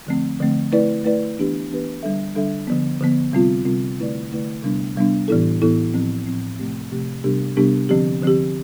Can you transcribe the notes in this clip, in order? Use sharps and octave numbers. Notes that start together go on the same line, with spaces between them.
D3 F3 A3 C4
D3 F3 A3 C4
A3 E4 B4 D5
A3 E4 B4 D5
E3 B3 D4 G4 B4
E3 B3 D4 G4 B4
D3 G3 D4 A4 E5
D3 G3 D4 A4 E5
D3 F3 B3
D3 F3 B3
C3 G3 C4 F4
C3 G3 C4 F4
D3 A3 E4 B4 D5
D3 A3 E4 B4 D5
C3 G3 B3 D4
C3 G3 B3 D4
A2 E3 B3 E4 A4
A2 E3 B3 E4 A4
A2 F3 C4
A2 F3 C4
C3 F3 A3 C4 G4
C3 F3 A3 C4 G4
C3 G3 B3 D4 G4
C3 G3 B3 D4 G4
D3 F3 C4 G4
D3 F3 C4 G4